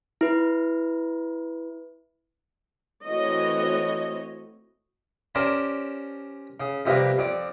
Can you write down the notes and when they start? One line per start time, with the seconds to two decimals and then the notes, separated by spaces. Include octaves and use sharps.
0.21 E4 B4
3.05 E3 A3 C4 F#4 C#5 D#5
5.35 C#4 G4 A#4 C5 D5 A5
6.60 C#3
6.86 F2 C3 G3 A#3 B4
7.18 F2 D5 D6